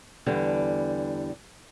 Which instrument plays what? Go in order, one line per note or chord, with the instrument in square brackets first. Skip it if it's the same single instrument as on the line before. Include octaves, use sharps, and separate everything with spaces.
[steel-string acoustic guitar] E2 D3 E3 G3